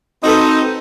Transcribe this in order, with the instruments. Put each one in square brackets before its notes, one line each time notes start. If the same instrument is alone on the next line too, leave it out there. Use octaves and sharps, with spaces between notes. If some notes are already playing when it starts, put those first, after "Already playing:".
[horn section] C4 D#4 [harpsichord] F#4 A4 B4